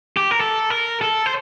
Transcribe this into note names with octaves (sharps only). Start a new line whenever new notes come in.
G4
A#4
A4
A#4
A4
C5